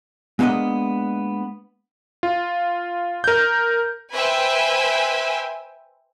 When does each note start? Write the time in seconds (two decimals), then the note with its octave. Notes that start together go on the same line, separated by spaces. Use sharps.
0.39 G#3 A#3 B3 D4 G#4 D#5
2.23 F4
3.24 A#4 G6
4.14 B4 C5 E5 G5 G#5